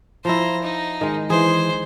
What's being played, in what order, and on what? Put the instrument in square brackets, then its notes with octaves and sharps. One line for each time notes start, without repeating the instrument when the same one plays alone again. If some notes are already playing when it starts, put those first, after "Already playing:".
[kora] F3 E4 [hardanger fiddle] C5 A#5
[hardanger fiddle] D#4
[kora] D#3 G#3
[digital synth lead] E3 [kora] G#4 [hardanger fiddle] C5